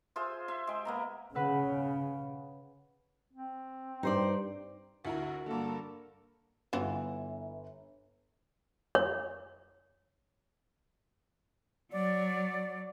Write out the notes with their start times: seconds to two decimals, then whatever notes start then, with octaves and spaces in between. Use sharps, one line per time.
0.16 F4 G#4 C5 E5
0.48 E5 C6
0.67 G#3 G5
0.85 A#3 B3 A#5
1.35 C#3 B4 F#5 E6
3.33 C4
4.03 G2 D#4 C5 D5
5.05 D2 E4 F#4 A#4
5.46 G2 D3 A#3 A4 A#4
6.73 G1 E3 B3 F4 F#4
8.95 C#5
11.92 F#3 D5